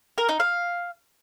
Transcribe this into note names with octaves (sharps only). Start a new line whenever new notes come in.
A#4
D#4
F5